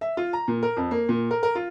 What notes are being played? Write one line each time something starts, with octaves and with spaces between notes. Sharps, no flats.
E5
F4
A#5
A#2
A#4
F2
A#3
A#2
A#4
A#4
F4